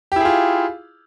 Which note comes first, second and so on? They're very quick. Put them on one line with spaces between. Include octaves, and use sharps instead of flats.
G4 E4 G#4 F4